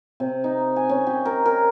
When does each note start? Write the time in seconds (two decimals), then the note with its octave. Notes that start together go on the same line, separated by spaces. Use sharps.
0.20 C3
0.44 D#4
0.76 G#5
0.89 C#4
1.07 G4
1.25 A#4
1.46 A#4